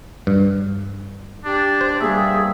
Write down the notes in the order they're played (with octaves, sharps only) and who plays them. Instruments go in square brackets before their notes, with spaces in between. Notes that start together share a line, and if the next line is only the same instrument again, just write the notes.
[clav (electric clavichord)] G2
[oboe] D4 [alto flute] G4
[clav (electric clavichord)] C5
[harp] G2 A#2 [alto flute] G#4 [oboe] E5